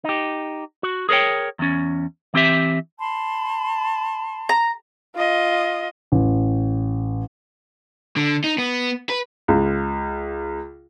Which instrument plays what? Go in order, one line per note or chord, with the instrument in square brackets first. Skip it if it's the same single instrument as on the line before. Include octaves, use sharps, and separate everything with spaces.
[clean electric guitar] D#4 G4
F#4
G#4 A#4 C5 C#5 G5
E2 C#4
E3 C4 G4 E5
[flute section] A5 B5 C6
[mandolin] A#5
[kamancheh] F4 D#5
[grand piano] A1
[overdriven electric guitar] D3
D#4
B3
B4
[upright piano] C#2